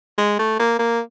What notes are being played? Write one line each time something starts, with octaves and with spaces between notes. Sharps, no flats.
G#3
A3
A#3
A#3